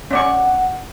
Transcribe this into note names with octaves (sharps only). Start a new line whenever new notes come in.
C#4 D5 F#5 C#6